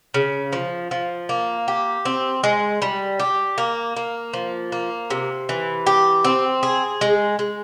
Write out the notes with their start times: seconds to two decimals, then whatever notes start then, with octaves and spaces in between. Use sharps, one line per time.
0.14 C#3
0.53 F3
0.91 F3
1.29 A#3
1.68 G4
2.05 C4
2.44 G#3
2.82 G3
3.20 G4
3.58 A#3
3.96 A#3
4.34 F3
4.72 A#3
5.10 C3
5.49 E3
5.86 G4
6.24 C4
6.63 G#4
7.01 G#3
7.39 G#3